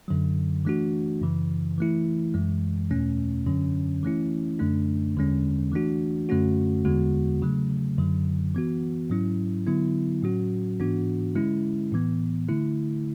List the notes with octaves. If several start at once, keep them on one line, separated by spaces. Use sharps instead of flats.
F#2 D3 F#3
E3 A3 D4 F#4
F#2 C#3 E3
E3 A3 E4
F#2 E3 G#3
E2 B2 A3 C#4
F#2 D3 F#3 C#4
E3 A3 C#4 E4
F#2 D3 A3 D4
E2 D3 G#3 C#4
E3 A3 D4 F#4
F#2 D3 A3 C#4 F#4
E2 D3 G#3 B3 F#4
C#3 F#3 A3
F#2 D3 F#3
E3 B3 F#4
G#2 F#3 C#4 E4
D3 F#3 B3 E4
A2 F#3 C#4 F#4
G#2 E3 B3 D4 F#4
D3 G#3 C#4 E4
A2 E3 B3
D3 A3 E4